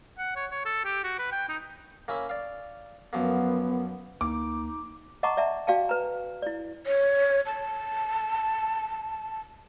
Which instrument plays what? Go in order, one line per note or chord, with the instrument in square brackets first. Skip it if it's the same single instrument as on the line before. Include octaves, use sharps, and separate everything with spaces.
[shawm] F#5
C#5
C#5
A4
G4
F#4
B4
G5
D#4
[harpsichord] A#3 C#4 E4
D5 F5
[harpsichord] F#2 F3 A#3 [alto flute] B3
[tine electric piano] D2 A#3 [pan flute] D#4 [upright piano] D6
[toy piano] D#5 F#5 A5 A#5 C#6 D6
D5 E5 A5 A#5
F#4 D5 F5 G5 A5
B4 A#5
E4 D5
[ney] C#5
A5